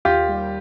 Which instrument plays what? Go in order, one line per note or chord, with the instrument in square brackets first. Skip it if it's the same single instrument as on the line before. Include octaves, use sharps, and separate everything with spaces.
[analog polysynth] D#2 [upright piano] F4 G4
[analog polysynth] G3